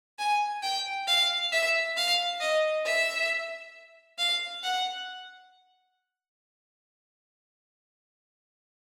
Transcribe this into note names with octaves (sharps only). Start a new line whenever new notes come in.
G#5
G5
F5
E5
F5
D#5
E5
F5
F#5